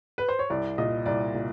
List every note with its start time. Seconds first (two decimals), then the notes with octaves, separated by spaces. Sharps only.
0.18 B4
0.29 C5
0.39 C#5
0.50 C2 D5
0.78 A#2 D#5
1.06 C2 D5
1.34 A#2